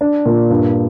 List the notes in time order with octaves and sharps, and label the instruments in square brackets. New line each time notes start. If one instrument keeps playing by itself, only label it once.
[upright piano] D4
A#2
G2